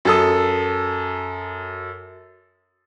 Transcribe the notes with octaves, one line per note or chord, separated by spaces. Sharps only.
F#2 A4 D#6